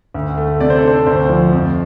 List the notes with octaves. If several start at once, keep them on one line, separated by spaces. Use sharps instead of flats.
D2
A3
C3 D5
C5
A4
D4 C5
D2 C5
F3
F2